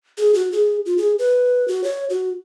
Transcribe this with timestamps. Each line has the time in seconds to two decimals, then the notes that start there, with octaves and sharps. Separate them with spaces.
0.18 G#4
0.34 F#4
0.52 G#4
0.86 F4
0.98 G#4
1.19 B4
1.68 F#4
1.84 C#5
2.10 F#4